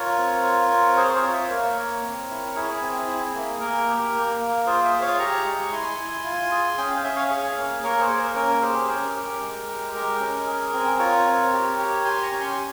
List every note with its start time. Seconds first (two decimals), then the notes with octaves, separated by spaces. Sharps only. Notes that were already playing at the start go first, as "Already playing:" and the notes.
Already playing: F4 A#4 C#5
0.18 C4
0.44 F4
0.71 C4
0.97 G#4 C5
1.15 A#4 C#5
1.23 F4
1.32 C5 E5
1.50 A#3 A#4 C#5
1.76 A#3
2.02 C4
2.30 E4
2.56 E4 G#4
2.82 C4
3.08 E4
3.35 A#3
3.60 A#3 A#4
3.88 G4
4.14 A#3
4.40 A#3
4.66 F4 G#4 C5
4.84 C5 E5
4.92 G#4
5.01 C#5 F5
5.19 G4 A#5 C#6
5.45 G#3
5.72 E4 G#5 C6
5.98 E4
6.24 F4
6.51 G#4
6.78 C#4 G5
6.90 F5
7.03 C#4 E5
7.16 C#5 F5
7.30 G#4
7.57 A#3
7.83 A#3 A#4 C#5
8.01 G#4 C5
8.10 A#3
8.18 A#4
8.35 C#4 A#4
8.62 G4 G#4 C5
8.88 C#4 A#4
9.15 G4
9.41 G#3
9.68 G4
9.93 G#3 A#4
10.20 C#4
10.47 G#4
10.73 C4
10.99 F4 A#4 C#5
11.26 C4
11.53 G4
11.78 G4
12.04 G4 G#5 C6
12.22 A#5 C#6
12.32 C#4
12.40 G#5 C6